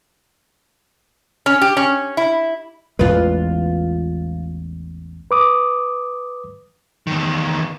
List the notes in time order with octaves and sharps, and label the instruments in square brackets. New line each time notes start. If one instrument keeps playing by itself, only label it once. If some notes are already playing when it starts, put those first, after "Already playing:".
[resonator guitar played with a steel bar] C#4
G4
C#4
E4
[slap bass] A1 E2 G#3 [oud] F4 B4
[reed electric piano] B4 D6 D#6
[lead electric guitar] E2 D#3